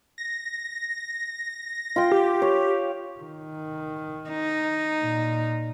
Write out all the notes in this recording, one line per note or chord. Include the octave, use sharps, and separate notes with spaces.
A#6
F4 G5
G4
C#5
D#3
D#4
A#2